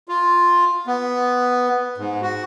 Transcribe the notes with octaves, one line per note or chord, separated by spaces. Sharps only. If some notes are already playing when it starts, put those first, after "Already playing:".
F4
B3
G#2
F#4